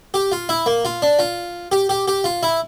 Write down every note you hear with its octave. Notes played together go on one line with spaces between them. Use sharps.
G4
F4
E4
A#3
F4
D4
F4
G4
G4
G4
F4
E4